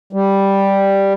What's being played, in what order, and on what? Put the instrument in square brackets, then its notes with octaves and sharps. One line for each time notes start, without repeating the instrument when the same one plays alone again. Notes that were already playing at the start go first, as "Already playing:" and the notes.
[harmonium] G3